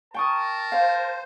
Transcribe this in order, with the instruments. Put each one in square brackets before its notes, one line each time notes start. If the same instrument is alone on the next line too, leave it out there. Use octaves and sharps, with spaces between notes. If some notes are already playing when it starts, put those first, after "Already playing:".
[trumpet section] A#4 A5 [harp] G5 C#6 D#6
[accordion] C5 [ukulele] F5